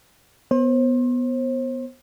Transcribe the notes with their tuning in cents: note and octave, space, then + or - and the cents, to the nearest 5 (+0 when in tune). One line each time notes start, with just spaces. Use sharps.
B3 +0 C5 +35